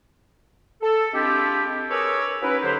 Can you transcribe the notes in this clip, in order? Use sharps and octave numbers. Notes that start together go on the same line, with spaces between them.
A4
G#3 C4 D4 E4 F4 G4
G#4 A#4 B4 C#5 D6 E6
F#3 C#4 D#4 E4 B4
D#2 D3 F#3 G4 C5